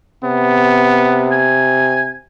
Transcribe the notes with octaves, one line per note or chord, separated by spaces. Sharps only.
C3 B3
G#5